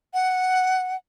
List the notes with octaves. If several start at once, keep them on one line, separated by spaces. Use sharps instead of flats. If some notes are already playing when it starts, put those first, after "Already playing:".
F#5